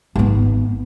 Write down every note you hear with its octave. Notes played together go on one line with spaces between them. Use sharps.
G#1 B3